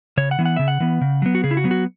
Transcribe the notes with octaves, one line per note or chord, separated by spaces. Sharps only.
C#3 C#5
F#5
E3 B3
F#5
C#3 E5
F#5
E3 B3
C#3
F#3 B3
F#4
C#3 G#4
E4
F#4
F#3 B3
F#4